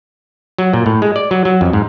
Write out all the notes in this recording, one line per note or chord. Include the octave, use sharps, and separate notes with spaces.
F#3
A#2
A2
G#3
D5
F#3
F#3
F2
G#2